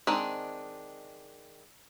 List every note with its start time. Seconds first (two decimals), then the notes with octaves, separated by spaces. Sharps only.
0.07 D#3 G#3 C4 D4